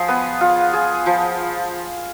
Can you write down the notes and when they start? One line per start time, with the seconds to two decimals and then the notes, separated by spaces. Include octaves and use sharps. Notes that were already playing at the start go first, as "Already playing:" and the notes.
Already playing: F3 G#4
0.08 B3
0.41 F4
0.73 G#4
1.06 F3